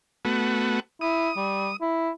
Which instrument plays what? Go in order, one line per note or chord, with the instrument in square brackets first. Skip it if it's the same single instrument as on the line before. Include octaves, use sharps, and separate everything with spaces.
[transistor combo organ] A3 B3 F#4
[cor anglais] E4 [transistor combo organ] D#6
[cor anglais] G3
E4